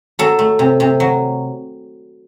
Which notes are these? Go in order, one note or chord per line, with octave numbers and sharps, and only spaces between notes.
F#3 A4
A3
C3
C3
F#3